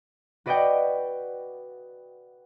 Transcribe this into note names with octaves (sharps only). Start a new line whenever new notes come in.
F#4 B4 D5 D#5 F#5 G5